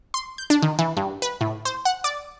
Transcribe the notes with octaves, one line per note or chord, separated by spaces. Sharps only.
C6
G6
D4
D#3
E3
G2
B4
A2
C5
F#5
D5